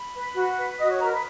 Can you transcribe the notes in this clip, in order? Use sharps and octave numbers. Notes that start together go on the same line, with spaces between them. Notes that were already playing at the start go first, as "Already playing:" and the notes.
Already playing: B5
B4
F#4
B4
F#4 D#5 D#6
C#5 C#6
A#4 B4 A#5
B4 B5